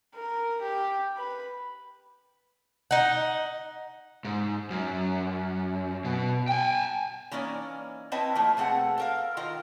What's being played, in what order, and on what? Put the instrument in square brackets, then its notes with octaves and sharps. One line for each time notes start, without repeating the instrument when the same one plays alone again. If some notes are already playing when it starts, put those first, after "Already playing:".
[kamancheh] A#4
G4
B4
[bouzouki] D#4 F#5
[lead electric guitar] G#2
F#2
B2
G5 G#5
[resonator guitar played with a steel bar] E3 A#3 C#4 D#4 D5
C4 E4 B4 D#5 A5
F3 A3 A#3
B2 A3 C4 G#4 F#5
A4 A#4 F5
D#3 F4 A#4 D#5